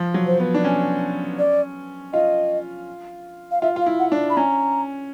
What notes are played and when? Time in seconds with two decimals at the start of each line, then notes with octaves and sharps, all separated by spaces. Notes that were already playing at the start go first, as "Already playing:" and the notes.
Already playing: F3
0.14 F#3
0.26 C5
0.39 B3
0.54 D4
0.64 C#4
1.39 D5
2.13 F4 D#5
3.51 F5
3.62 F4 E5
3.76 F4 F5
3.86 E4
3.99 F#5
4.12 D4
4.30 B5
4.37 C#4 A#5